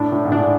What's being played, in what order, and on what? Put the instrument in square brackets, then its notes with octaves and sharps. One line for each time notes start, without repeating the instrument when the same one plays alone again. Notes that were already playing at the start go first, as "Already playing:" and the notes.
Already playing: [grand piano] A2 [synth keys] D4
[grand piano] A2
G#2
[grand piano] A2 [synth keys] D4